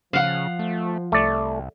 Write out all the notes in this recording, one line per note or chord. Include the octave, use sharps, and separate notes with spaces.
C#3 F3 F5 F#5
A3
C2 A3 D5